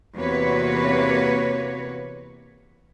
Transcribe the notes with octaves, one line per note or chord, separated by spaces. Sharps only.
E2 C3 A#3 F#4 B4 C#5